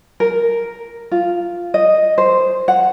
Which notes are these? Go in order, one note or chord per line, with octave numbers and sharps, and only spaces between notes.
A#4
F4
D#5
C5
F#5